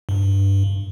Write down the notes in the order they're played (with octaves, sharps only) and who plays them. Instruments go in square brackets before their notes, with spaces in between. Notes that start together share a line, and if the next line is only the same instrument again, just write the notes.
[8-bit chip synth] G2